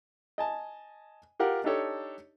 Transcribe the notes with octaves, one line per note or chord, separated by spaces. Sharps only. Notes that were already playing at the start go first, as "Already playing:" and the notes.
D#5 G#5 A5
F4 G4 A#4 F#5
D4 D#4 G4 A4 C#5